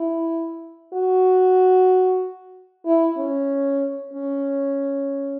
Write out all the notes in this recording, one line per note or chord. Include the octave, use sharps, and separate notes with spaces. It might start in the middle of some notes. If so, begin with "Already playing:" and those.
Already playing: E4
F#4
E4
C#4
C#4